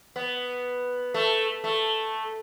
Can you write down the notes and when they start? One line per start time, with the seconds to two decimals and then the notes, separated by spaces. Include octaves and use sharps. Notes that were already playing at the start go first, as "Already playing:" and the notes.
0.16 B3
1.14 A3
1.64 A3